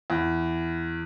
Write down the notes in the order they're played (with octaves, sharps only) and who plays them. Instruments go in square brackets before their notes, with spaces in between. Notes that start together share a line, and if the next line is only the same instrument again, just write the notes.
[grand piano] E2